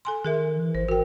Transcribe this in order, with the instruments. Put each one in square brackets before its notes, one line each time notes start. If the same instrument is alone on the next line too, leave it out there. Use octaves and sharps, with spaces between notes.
[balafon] A4 G#5 C6
[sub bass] D#3 [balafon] G#4 A#4 E5
[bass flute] E3
[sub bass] G#1 [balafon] C5
[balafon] F#4 G5 [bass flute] A#4